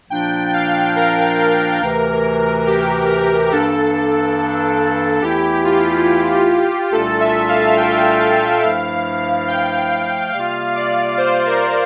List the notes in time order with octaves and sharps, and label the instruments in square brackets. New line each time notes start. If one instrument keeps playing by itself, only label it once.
[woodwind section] A#2 F3 A#3 D4 [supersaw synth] G5
[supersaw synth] F5
A#4
[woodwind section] D2 C3 E3
[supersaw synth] G4
A#4
[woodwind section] G2 E3 A#3 D4 [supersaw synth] A4
[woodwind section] E2 E3 A3 E4 [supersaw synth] G4
[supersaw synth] F4
[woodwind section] C2 A#2 A3 D4 F4 [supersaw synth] A4
[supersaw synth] E5
F5
G5
F5
[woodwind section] G2 F3 A3 E4
[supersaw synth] G5
[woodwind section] C3 G3 A#3 F4 [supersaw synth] F5
[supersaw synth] D5
C5
A#4